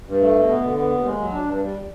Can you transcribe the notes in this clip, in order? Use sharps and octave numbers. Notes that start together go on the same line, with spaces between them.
G2
A3
B2
B3
D3
B3
D#2
G#3
F#3
D4
G2
G3